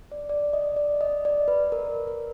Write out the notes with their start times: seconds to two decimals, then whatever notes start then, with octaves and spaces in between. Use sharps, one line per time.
0.12 D5
0.29 D5
0.53 D#5
0.76 D5
1.01 D#5
1.25 D5
1.48 B4
1.72 A#4
2.07 A#4